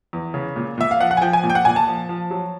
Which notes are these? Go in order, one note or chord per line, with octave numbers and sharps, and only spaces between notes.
E2
C#3
A#2
A#2 E5
F5
F3 F#5
F#5
G#5
F3 G5
G#5
A#2
G5
F#5
A#2 G#5
A5
F3
F3
F#3